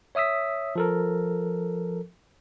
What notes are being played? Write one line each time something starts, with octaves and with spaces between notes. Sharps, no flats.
C#5 E5 D#6 E6 B6
F3 A4 A#4